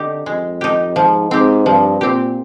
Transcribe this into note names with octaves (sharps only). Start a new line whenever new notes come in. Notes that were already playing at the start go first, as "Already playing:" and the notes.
Already playing: D3 D#4 G4
F2 G#3
D#4 G4
G#2 F3
G#2 C4 G4
G2 F3
A#2 C4 G4